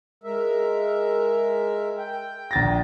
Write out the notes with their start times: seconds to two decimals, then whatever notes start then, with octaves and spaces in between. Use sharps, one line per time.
0.24 G#3 A#4 E5
1.98 G5
2.51 A#1 A6 A#6